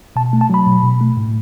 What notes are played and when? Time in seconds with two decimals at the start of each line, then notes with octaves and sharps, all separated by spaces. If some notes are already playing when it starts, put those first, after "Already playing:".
0.16 B2 A5
0.33 A3
0.41 A5
0.50 F#3 B5
0.67 B2
0.83 B2
1.01 A3
1.17 A2